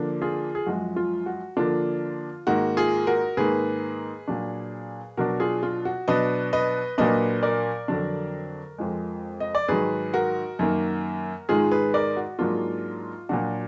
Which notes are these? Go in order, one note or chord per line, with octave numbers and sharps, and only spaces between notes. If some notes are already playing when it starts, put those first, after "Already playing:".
Already playing: D3 F3 A#3 D4
F4 G#4
G#4
F#2 F3 G#3 F#4
F4
F#4
D3 F3 A#3 D4 F4
G#2 D#3 A#3 F#4
F4 G#4
F#4 A#4
G#2 D#3 A#3 G#4 B4
A#2 F#3 D4
B2 F#3 D4 F#4 A#4
F4 G#4
F4
F#4
B2 F#3 D4 B4 D#5
B4 D#5
A#2 F#3 A#3 D4 B4 D#5
A#4 D5
F2 D3 F#3 D4
F2 F3 G#3
D#5
D5
G#2 D#3 F#3 G#4 B4
F#4 A#4
F#2 D#3 A#3
G#2 D#3 G#3 F4 G#4
G#4 B4
A#4 D5
F#4
G#2 F#3 A#3 D4 F4
A#2 F#3 D4 F#4